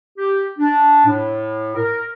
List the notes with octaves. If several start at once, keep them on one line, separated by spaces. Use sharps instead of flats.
G4
D4
A2
A#4